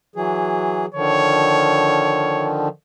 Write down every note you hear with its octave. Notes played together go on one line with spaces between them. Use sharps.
E3 F#3 G#4
D3 D#3 F3 C#5